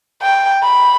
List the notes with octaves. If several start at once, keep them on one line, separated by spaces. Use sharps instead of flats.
G5
B5